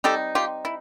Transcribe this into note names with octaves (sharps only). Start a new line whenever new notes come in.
G3 C4 D#4 G4 A4
F4 G4
E4